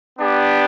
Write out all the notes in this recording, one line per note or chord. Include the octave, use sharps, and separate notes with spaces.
B3 D4 G4